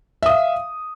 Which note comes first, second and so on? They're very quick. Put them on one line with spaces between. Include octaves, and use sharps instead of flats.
E5 D#6 F5